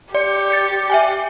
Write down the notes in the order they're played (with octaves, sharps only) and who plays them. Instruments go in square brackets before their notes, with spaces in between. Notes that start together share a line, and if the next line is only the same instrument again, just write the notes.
[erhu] G4 [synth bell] D5 C#7
[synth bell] A6 C#7
E5 G5 G#5